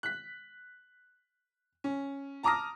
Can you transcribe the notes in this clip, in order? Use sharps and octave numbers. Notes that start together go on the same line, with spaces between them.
F#6 B6
C#4
A5 A#5 D6 D#6 F6 A#6